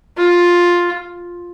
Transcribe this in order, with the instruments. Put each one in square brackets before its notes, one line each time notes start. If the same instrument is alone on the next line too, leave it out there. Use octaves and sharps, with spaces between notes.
[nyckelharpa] F4